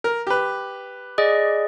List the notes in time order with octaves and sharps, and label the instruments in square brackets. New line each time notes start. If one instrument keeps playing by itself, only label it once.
[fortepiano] A#4
G4 B4
[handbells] G#4 D5 D#5